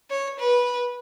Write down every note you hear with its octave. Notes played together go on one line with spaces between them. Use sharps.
C#5
B4